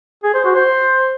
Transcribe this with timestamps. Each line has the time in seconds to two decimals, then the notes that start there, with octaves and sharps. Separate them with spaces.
0.24 G#4
0.34 C5
0.45 F#4
0.55 C5